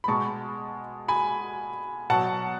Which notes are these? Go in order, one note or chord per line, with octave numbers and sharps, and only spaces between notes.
B5
B2 G#3 A5 C#6
G#5 B5
B2 F#3 F#5 A5